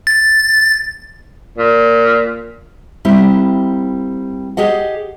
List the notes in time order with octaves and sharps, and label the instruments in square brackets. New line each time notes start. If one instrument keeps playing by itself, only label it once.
[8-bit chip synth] A6
[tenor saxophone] A#2
[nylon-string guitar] G3 A#3 C4 E4
G4 G#4 D#5 F#5